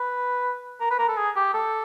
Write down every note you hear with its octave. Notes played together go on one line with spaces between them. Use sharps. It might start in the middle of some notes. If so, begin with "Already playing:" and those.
Already playing: B4
A#4
B4
A#4
A4
G#4
G4
A4